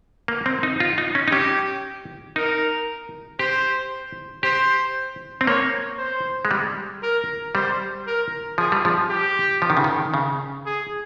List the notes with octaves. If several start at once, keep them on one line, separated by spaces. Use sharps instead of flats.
A#3
C4
D#4
F4
D#4
C#4
D#4
C#4 G4
D#4 A#4
G4 C5
G4 C5
C4
A#3 C#5
C5
G#3
G3
A#4
G3 C5
A#4
F3 G#4
G3
F3
G4
F3
D#3
C#3
D#3
C#3
G#4